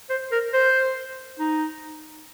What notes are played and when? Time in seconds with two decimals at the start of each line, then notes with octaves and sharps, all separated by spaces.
0.10 C5
0.32 A#4
0.53 C5
1.40 D#4